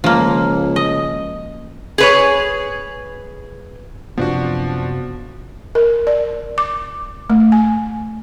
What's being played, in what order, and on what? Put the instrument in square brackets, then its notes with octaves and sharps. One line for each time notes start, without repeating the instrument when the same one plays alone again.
[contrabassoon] C#2 [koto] F3 A#3
[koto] D#5
[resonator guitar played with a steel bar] G#4 B4 C#5
[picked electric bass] F#2 C3 B3 [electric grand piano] F3 D4 F#4
[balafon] A#4
D5
D6
A3
G#5